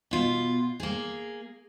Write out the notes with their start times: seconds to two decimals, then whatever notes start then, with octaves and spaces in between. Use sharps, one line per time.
0.11 B2 F4
0.80 A#3 G#4